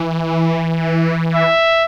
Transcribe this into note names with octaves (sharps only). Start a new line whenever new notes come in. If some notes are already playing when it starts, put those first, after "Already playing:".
Already playing: E3
E5